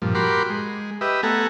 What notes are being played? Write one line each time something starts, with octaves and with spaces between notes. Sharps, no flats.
G2 A#2 F3
F#4 G4 A#4 B5 C6 D6
G#3
G4 B4 D#5 E5
A3 B3 A4 F#5 G#5 A#5